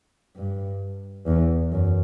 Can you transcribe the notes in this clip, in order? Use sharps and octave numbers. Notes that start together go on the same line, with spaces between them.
G2
E2
F#2